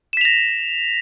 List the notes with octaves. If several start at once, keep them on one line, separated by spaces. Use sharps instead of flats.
A#6 B6 E7 F7